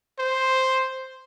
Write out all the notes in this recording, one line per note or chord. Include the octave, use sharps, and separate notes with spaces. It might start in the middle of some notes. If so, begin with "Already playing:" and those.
C5